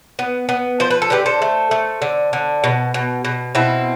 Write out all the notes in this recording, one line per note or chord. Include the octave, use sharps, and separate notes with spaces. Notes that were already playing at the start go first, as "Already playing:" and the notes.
B3
B3
F3 C5
B4
A4
D3 G4 B4
A4 C5
A3
A3
D3
D3
B2
B2
B2
B2 C4 E4